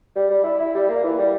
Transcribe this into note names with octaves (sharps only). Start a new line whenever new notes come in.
G3
G3
E4
E4
G3
A#3
E3
G3